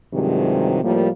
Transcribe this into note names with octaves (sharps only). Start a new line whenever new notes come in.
G2 C3 D#3 F3 F#3 G#3
A2 F3 G3 A#3